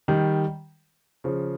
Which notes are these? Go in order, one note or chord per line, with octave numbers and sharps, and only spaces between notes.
D#3 G3
C#3 F3